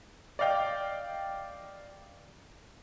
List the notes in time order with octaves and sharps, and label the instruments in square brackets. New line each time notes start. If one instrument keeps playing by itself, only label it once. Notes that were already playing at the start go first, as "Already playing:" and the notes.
[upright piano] D5 D#5 F5 G5